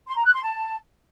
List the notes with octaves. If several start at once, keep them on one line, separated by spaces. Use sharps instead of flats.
C6
A#5
F#6
C6
A5